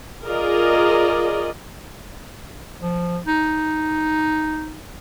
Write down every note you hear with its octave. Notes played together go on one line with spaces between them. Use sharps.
F4 G#4 A#4 D5 D#5
F3
D#4